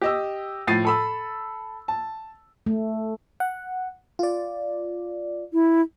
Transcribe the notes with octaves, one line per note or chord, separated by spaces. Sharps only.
G4 D#5 E6
A2 F3 A6 C7 D#7
A4 B5 E6
A5
A3
F#5
F4 D5
E4